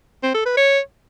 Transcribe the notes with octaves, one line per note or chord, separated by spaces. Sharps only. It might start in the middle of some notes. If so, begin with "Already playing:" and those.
C4
A4
B4
C#5